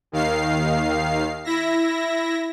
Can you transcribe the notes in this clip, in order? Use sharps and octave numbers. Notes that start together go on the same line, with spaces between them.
D#2 D#3 F5 C7
E4 E5 A#6